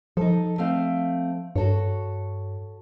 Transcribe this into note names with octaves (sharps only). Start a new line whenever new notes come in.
F3 D#4 A4
A3 C4 F5
G2 F#4 A4 C#5